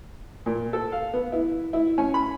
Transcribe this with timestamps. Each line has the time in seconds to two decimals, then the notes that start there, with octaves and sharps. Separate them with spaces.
0.46 A#2
0.73 A4
0.92 F5
1.13 B3
1.32 E4
1.73 E4
1.98 C#4
2.14 B5